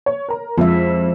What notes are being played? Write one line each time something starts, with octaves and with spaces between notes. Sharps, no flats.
C#5
A#4 A#5
F2 F3 G#3 E5